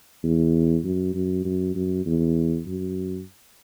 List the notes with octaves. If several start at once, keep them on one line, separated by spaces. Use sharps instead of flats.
E2
F#2
F#2
F#2
F#2
E2
F#2